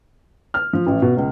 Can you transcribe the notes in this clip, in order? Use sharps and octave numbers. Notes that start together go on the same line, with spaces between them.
F6
F3
A1
B2
C#2